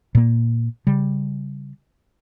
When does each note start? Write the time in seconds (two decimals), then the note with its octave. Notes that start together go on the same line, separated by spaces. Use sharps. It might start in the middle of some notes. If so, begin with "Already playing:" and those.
0.15 A#2 A#3
0.87 C#3 G3